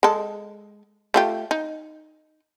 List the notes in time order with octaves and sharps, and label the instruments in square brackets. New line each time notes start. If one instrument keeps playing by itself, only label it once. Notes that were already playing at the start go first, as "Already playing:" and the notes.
[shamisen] G#3 A4
A3 F4 G4
D#4